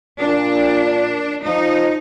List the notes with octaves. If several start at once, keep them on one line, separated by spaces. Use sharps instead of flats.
A#2 D4
F3 D#4